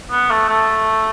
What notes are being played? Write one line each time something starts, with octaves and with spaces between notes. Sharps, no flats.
B3
A3
A3